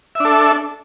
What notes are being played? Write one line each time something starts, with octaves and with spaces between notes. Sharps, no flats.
D4 A4 E5